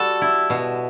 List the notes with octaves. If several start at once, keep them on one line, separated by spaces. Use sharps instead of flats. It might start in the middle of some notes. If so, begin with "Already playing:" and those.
Already playing: G3 F#4 A4
E4
B2